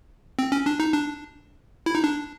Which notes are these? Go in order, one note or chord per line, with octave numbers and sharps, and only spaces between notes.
C4
C#4
D4
D#4
D4
E4
D#4
D4